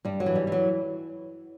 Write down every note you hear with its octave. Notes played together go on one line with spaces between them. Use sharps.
G2 G3
F#3
E3
G3
E3 F#3